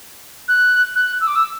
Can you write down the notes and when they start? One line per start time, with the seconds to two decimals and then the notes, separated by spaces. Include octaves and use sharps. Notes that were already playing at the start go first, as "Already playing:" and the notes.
0.48 F#6
0.95 F#6
1.21 E6
1.27 D6
1.36 E6